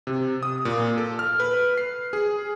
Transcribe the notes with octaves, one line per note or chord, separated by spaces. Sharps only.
C3
D#6
A#2
A4
F6
B4
C7
G#4